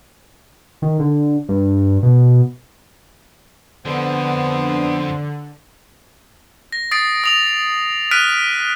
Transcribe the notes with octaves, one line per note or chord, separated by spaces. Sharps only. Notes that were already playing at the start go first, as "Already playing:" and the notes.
D#3
D3
G2
B2
F2 D3 F3 B3 C5
A#6
D#6 A6 C7 D7
D#6 F7 F#7
F6 F#6 B6 D7 D#7